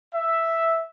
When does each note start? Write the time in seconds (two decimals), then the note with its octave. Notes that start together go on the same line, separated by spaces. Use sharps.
0.13 E5